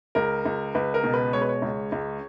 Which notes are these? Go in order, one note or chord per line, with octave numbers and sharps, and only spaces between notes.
C#2 A#4
C#2
C#2 B4
A#4
B2
B4
G#3 C#5
B4
C#5
C#2
C#2